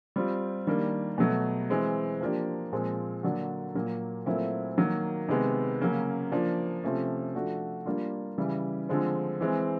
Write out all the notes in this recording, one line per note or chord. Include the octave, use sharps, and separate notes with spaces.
G3 C4 F4
D#3 G3 A#3 D4
B2 F#3 A3
E3 G#3 C4
F3 A#3 D4 G4
A#2 F3 G#3 C4
D3 F#3 A#3 D4 F#4
A#2 F#3 A#3
A#2 F#3 A3 C4 E4
D#3 F#3 A#3
C3 D#3 G#3 B3
C#3 F#3 A#3 C#4
F3 A#3 D4
C3 F3 A3 C#4
F3 A3 D4 F#4
G3 A#3 D4 F4
C#3 E3 G3
D3 F3 G#3 C4
E3 G#3 C4